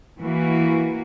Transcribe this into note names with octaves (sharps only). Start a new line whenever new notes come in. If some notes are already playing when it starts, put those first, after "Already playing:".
E3 A#3 F#4